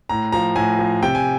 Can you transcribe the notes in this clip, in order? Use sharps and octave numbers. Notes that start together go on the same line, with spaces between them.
A2 A#5
F3 A#5
A2 G#5
F3
C3 G5
G#5